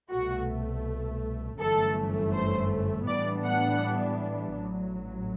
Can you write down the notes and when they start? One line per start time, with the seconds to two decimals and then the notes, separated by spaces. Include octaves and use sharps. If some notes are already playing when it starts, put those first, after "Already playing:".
0.10 C2 B2 A3 F#4
1.59 G1 F#2 E3 A3 A4
2.33 C5
3.07 A2 E3 G3 B3 D4 D5
3.45 F#5
4.56 A1 A2 F#3